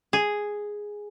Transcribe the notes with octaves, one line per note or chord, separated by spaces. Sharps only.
G#4